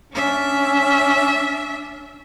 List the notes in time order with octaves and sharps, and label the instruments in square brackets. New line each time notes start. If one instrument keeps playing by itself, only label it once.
[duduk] C#4 [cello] D4 E5